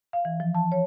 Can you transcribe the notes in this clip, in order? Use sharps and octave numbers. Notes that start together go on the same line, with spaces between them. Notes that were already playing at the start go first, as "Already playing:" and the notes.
F5
E3
F3
A5
C#5